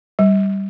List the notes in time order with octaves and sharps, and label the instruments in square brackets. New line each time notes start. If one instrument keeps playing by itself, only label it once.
[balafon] G3